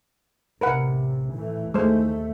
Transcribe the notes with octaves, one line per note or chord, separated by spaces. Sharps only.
A1 C3 A#4 B4 F#5
A2 E3 A3
D#2 G#3 A3 C5